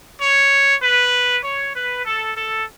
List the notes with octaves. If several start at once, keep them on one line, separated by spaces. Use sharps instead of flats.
C#5
B4
C#5
B4
A4
A4